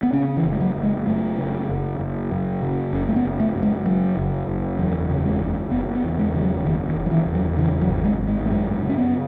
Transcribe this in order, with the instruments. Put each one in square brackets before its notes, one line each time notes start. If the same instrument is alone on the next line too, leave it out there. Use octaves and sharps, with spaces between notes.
[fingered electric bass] B3
C#3 C#4
E3
F#1
G#3
F#3
F#1
G#3
F#2 A3
C#3
F#1
F#1
F#2
C#3
F#1 C#4
A3
B3
F#1
A3
F#2
G#3
C#3 F#3
F#1
F#1
E2 F#3
C#3
G#3
F#1
F#1 B3
B3
E2
G#3
C#3 E3
F#3
F#1 D#3
D#3
F#1
F#3
E3
E2
F#3
C#3 E3
F#3
G#1
G#3
G#1
G#3
A3
F#2 G#3
C#3
C#4
B3